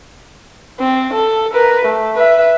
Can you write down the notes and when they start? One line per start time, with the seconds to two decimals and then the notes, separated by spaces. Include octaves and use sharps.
0.80 C4
1.14 A4
1.53 A#4 B4
1.86 A3
2.15 B4 E5